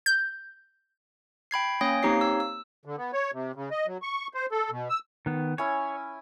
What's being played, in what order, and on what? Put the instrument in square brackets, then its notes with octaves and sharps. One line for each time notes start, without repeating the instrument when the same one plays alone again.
[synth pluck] G6
[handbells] G5 B5 G#6 C7
A#3 C#4 C#5 G5 D#6 A#6
A#3 C4 D#4 G4 C#5 C7
E6
E6
[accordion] D3
B3
C#5
C3
C#3
D#5
F#3
C#6
C5
A4
B2
E6
[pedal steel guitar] D#3 B3
[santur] C#4 E4 G#5 [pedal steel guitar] C#5